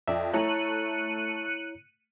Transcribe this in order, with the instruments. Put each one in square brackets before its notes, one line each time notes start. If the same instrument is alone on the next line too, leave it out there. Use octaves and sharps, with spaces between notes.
[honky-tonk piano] F2 [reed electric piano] D5 E5
[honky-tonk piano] A3 [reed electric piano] E4 C#5 A#5 [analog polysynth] F#6 C#7 D#7